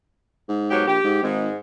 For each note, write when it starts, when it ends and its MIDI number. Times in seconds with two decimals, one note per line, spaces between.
0.48 0.86 44
0.70 0.85 47
0.70 0.85 54
0.70 0.85 67
0.87 0.99 34
0.87 1.21 67
1.04 1.22 44
1.23 1.49 32
1.23 1.56 44